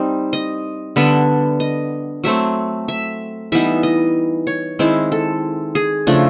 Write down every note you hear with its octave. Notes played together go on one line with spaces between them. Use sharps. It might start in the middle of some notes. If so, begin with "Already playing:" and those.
Already playing: G3 C4 D#4
D#5
D3 G3 B3 D4 E5
D#5
F#3 A3 C4 E5
E5
E3 G3 B3 D#4 E5
D#5
C#5
D#3 G#3 C4 E4
A4
G#4
C#3 F3 A3 D4